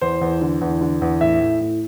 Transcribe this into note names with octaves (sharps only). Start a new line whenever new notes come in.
E2 C5
E2
D3
E2
D3
E2
A2 E5
A2
A2